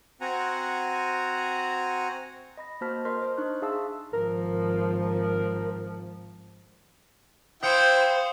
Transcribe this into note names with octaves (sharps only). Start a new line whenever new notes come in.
C4 F#4 F#5 G#5 A#5
D#5 B5 A#6
A#3 F#4 C5 A5 F6 B6
A#4 D#5 C6 F6 B6
C5
D4 D#4 C#6 F#6
G#4 E5 F5 A5 C6 E6
G#1 F3 A#4
E4 C5 F5 G5 D#6 G6 C#7